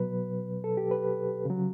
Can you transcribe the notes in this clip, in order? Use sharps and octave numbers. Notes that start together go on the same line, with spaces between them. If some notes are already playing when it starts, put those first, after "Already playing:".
Already playing: B2 F#3 B4
A4
G4
B4
C#3 F#3